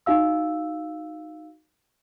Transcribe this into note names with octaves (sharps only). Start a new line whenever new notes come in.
D#4 F#4 F5 E6